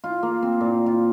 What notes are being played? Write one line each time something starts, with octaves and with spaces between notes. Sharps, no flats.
F4
A#3
C4
A#2
F4